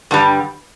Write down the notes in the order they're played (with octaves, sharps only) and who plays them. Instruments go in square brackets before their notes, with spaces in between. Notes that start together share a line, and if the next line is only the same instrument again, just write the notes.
[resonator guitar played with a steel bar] G2 D3 G3